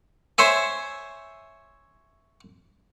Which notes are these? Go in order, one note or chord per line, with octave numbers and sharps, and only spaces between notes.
C5 C#5 E5 G#5